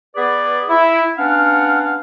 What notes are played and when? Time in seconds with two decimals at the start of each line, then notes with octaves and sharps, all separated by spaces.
0.15 B3 G#4 B4 D5
0.69 E4
1.17 B3 C#4 D4 F5 F#5